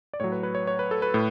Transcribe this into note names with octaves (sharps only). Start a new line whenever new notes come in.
D5
A2 F#3 C#5
B4
B4
C#5
C#5
B4
A4
B4
A2